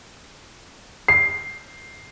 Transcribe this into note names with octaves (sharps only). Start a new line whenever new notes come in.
C7